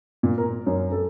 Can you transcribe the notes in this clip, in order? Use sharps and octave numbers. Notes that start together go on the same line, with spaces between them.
A#2
A#4
F#2
A4